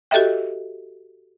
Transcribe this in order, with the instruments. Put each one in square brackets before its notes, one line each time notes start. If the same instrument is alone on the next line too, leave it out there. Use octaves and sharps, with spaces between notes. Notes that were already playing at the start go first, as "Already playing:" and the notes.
[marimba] F#4 G4 A4 D#5 E5 G5